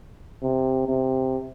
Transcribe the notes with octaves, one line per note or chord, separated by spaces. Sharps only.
C3
C3